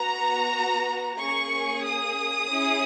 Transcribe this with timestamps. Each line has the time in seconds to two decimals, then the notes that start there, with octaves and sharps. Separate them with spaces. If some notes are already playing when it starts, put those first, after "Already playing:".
Already playing: B3 F#4 A#5
1.18 A#3 C#4 G#4 C#6
1.84 D#6
2.49 C#4 E4 G#4